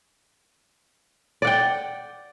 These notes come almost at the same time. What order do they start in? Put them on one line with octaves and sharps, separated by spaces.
D5 F#5 G5